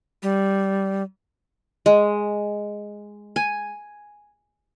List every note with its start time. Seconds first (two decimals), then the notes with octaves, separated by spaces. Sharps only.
0.23 G3
1.86 G#3
3.36 G#5